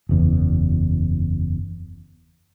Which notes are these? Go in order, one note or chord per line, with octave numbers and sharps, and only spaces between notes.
F#1 E2